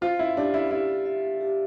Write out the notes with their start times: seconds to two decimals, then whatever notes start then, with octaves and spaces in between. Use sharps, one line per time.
0.01 F4 C5
0.19 E4
0.36 D4 G4
0.54 E4
0.71 E4 G4
1.06 E5
1.41 G4